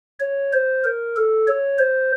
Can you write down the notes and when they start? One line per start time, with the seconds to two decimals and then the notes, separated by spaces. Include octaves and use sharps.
0.20 C#5
0.53 C5
0.84 A#4
1.16 A4
1.47 C#5
1.78 C5